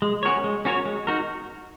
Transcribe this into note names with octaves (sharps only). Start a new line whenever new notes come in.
G#3
C#4 F#4 A#4 C#5
G#3
C#4 F#4 A#4 C#5
G#3
D#4 F#4 A#4